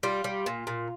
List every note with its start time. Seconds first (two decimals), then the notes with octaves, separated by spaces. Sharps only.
0.03 G3 F4
0.24 G3
0.46 A#2
0.67 A#2